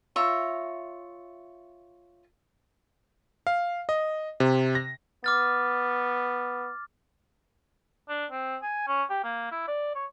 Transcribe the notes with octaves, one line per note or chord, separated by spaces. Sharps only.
F4 C#5 E5 A#5
F5
D#5
C3
A#6
B3 D6 F6 A6
D4
C4
G#5
C#4
G4
A#3
E4
D5
C#5